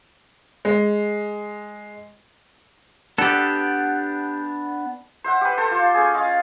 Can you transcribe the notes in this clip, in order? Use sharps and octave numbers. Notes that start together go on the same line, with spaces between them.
G#3
B3 D4 G4 A4
C5 E5 F#5
G4 B4
A4 C5
F4
C#4 G#4
F4 D#5 F5